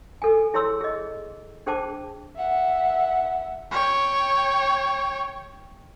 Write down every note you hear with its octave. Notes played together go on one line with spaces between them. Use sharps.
A4 G#5
E4 G#4 C#5 C6 E6
G#4 D#5
D4 G#4 C5 G5 A5 D6
E5 F#5
C#5 G5